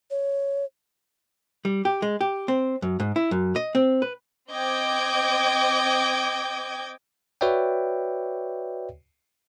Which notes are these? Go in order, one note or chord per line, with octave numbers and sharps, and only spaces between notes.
C#5
G3
G4
G#3
G4
C4
F#2
G#2
E4
F#2
D#5
C4
B4
C4 D#5 G5 D6 G6 G#6
F#4 B4 C#5 D5 E5 G5